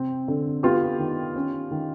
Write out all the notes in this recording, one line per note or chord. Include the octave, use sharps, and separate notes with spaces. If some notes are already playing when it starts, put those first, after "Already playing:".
Already playing: C3 C4
D3
B3 F4 G4
D#3
C#4
D#3